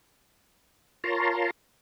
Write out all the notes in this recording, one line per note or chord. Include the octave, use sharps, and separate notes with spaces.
F4 A#4 C#5 A5 A#5 C6